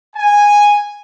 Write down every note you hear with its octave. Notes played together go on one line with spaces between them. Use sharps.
G#5